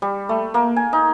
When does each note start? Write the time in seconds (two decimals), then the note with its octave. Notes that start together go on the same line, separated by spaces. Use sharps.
0.02 G3
0.29 A3
0.54 A#3
0.76 G#5
0.93 D#4